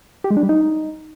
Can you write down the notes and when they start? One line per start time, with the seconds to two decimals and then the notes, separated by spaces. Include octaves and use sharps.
0.24 G4
0.31 G#3
0.37 D4
0.43 G3
0.49 D#4